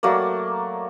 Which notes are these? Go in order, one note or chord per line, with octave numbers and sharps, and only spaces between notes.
F#3 A3 A#3 D5